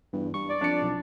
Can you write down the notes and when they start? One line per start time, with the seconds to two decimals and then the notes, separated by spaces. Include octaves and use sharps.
0.13 E2 G2
0.34 G2 C#6
0.48 D5
0.61 F2 D4 C#7
0.82 B1